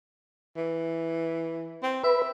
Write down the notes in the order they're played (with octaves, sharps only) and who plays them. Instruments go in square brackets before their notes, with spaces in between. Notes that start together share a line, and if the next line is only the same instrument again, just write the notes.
[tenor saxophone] E3
C4
[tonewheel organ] B4 [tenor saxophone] E5